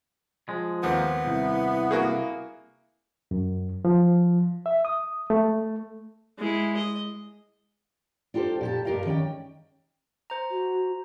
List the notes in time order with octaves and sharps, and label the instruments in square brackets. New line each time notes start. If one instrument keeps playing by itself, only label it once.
[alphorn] F3 [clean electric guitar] G#3
[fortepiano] D#2 C4 [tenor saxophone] B3
[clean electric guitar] C2 [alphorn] E4
[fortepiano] A#3 F#4 G#4
[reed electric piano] F#2
F3
E5
D#6
A3
[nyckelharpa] G#3 E4
D#5
[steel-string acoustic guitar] D4 F4 G4 A4 C5
A#2 G4 A5
G2 G4 A#4 D#5 F5
D#3 C#4 D5 G5
[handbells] C5 A#5
[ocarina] F#4